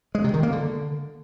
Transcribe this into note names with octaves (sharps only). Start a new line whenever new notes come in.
G#3
C3
D#3
A#3
D3